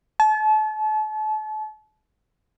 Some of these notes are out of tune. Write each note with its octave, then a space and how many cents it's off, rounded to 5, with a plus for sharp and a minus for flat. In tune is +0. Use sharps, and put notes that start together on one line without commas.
A5 -35